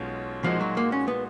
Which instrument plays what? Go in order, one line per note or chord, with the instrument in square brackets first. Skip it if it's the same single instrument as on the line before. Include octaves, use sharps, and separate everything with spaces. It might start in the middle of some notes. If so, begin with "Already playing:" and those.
Already playing: [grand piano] B1 B2 G#3 C#4 F4
[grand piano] A#2 G#3 D#4 F#4 [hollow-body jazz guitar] F3
[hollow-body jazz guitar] F#3
A#3
C#4
B3